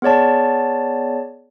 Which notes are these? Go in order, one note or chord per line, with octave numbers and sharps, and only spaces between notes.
B3 G#4 C#5 D5 A5